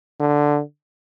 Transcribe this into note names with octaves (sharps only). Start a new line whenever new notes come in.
D3